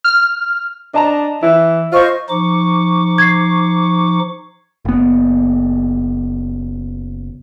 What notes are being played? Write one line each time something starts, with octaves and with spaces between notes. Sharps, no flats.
F6
D4 D#5 A5 A#5
E3 E4
F4 C5 D#5 C#6
F3 D#4 C#6 D6
G#6 C7
F#1 B3